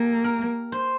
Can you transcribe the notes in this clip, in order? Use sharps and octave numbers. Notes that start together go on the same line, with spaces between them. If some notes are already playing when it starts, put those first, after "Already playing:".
Already playing: A#3 G4 A4
A#4
C5